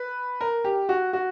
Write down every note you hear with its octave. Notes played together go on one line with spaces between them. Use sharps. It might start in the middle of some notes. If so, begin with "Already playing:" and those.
Already playing: B4
A#4
G4
F#4
F#4